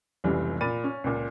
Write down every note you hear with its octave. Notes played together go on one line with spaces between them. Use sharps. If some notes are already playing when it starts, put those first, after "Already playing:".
F1 C#2 E3 G3
A#2 B5 A6 D#7
C#4
C#2 A#2